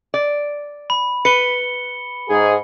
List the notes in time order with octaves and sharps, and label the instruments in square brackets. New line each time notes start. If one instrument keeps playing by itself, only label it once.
[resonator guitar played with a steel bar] D5
[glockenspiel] B5
[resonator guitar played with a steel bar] B4 [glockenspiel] C#7 G7
[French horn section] G#2 G#4